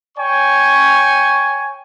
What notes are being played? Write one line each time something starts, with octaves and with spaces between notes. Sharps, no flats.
C#5 G5 G#5 C#6